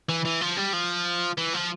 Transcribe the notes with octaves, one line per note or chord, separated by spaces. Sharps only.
E3
E3
F3
G3
F3
E3
F3